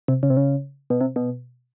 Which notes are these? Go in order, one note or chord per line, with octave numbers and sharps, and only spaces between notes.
C3
C#3
C3
C#3
B2
C3
B2